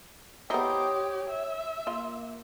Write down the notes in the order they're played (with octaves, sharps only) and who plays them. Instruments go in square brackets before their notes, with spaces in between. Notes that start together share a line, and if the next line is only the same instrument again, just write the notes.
[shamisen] B3 E4 [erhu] G4 [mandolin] C5 D#5 A#5 [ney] C#5
[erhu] E5
[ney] A#3 [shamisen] F4